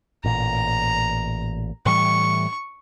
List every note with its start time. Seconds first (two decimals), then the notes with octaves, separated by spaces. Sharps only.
0.24 A1 A#2 A#5
1.86 A2 E3 G3 C#6